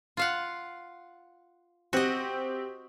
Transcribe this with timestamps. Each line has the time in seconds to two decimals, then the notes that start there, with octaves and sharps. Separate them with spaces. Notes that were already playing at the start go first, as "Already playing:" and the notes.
0.17 F4 F5 F#5
1.93 C4 F#4 G4 D#5